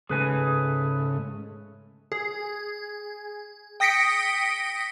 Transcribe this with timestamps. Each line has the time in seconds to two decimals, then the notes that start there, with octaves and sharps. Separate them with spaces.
0.09 G#2 C#3 A3 G#4 B4 G#5
2.12 G#4
3.80 G5 D#6 A#6 B6 C#7 D7